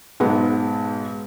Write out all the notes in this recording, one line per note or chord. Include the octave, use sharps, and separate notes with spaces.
B1 G#2 G#3 B3